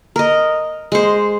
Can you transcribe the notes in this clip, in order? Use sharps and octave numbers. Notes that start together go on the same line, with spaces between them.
A#4 D#5
G#3 C5